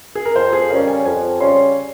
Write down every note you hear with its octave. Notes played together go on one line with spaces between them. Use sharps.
G#4
A#4
F2 C5
G#4
C#3 G3 C#4 A#4
G#5
F2 G#5
C#3 G3 C#4 C6